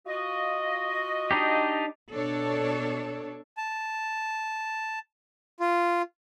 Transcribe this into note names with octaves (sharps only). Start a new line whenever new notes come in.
F4 F#4 D#5
D4 D#4 G4
B2 D4 A4 C#5
A5
F4